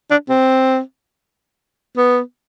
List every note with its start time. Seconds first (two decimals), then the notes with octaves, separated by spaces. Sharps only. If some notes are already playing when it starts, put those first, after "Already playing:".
0.10 D4
0.29 C4
1.97 B3